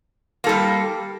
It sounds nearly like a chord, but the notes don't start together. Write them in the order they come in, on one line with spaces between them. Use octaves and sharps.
A#3 A4 G3